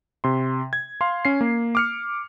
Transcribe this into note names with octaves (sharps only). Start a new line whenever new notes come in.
C3 C6
G#6
F5 C6
C#4 C7
A#3
D6 F6 C#7